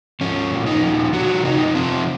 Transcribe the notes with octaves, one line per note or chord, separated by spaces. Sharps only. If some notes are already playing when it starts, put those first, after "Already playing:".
F3 C#4
A#2
D#4
F3
F3 F#4
C3 D#4
F3 C4